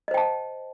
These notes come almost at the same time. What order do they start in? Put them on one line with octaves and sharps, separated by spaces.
D#5 C5 G5 A5